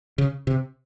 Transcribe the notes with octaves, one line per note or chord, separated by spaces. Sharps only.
C#3
C3